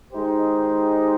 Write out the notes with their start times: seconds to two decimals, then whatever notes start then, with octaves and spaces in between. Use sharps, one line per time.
0.13 D#3 G#3 D#4 G4 C5